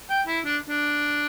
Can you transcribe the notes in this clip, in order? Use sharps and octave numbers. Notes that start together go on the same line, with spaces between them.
G5
E4
D4
D4